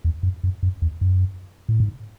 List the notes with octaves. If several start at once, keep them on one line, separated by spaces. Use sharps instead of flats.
E2
F#2
F#2
F#2
E2
F#2
A2
G#2